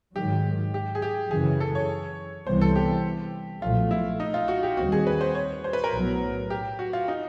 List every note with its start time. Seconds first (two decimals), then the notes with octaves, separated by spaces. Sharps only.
0.16 G#2 D#3 F#3 G4
0.74 G4
0.95 G#4
1.02 G4
1.31 F#2 C#3 E3 G#4
1.60 A4
1.75 C#5
2.47 C2 C3 E3 G3 B3 C5
2.61 A4
2.76 G4
3.62 B1 A#2 F3 A3 F4
3.91 E4
4.20 D#4
4.34 F4
4.48 F#4
4.63 G4
4.77 D#2 D#3 G3 C4 F#4
4.92 G#4
5.07 B4
5.21 C5
5.35 C#5
5.64 C5
5.73 B4
5.84 A#4
5.93 B1 A2 F#3 B3
6.50 G4
6.79 F#4
6.93 F4
7.08 D#4